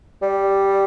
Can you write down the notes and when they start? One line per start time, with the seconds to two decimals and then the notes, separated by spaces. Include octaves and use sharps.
0.22 G3